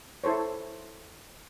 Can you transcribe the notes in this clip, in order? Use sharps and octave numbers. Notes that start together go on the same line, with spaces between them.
E4 A4 C5 C#5